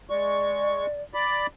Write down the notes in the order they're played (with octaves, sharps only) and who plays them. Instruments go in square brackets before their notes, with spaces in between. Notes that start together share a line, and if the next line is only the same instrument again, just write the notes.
[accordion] G#3 C#6 [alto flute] D5
[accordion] D5 B5